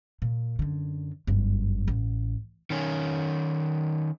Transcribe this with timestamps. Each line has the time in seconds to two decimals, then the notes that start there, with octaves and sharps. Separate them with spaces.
0.22 A#2
0.59 F#2 D3
1.27 G1 F#2
1.88 A1
2.70 D#3 C#4